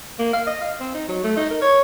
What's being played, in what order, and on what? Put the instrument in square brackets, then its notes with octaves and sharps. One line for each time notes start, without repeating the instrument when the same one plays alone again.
[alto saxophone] A#3
F5
D#5
F5
C4
D#4
F#3
A3
D#4
A#4
C#5